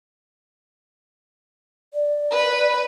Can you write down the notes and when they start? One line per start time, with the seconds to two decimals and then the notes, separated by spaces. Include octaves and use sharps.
1.94 D5
2.31 B4 B5